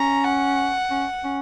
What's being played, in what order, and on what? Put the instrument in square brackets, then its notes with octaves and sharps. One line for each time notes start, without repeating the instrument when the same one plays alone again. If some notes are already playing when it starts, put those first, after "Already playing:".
Already playing: [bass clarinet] C#4 [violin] A#5
[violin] F#5
[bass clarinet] C#4
C#4